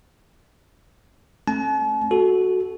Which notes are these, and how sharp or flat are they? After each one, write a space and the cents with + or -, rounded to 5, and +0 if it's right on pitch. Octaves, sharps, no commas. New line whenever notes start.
A3 +0 C#4 -40 A5 -45
F#4 +0 A4 -10